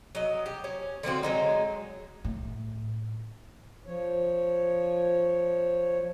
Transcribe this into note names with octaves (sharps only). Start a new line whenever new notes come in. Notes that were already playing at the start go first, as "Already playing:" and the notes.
F#3 D#5
G4
C#4
D3 F3 C4 F#4
F#3 G#3 D#4
A2
F3 C#5